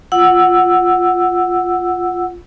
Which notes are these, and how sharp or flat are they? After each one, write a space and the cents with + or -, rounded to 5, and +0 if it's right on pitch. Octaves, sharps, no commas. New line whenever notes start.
F4 +0 F#5 +0 E6 +0